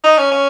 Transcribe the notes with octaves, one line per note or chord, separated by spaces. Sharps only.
D#4
C#4
C#4